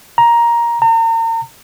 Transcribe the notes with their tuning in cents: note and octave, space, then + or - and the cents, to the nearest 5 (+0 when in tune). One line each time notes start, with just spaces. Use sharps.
A#5 +10
A#5 -40